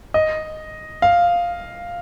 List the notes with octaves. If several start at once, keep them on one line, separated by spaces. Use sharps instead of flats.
D#5
F5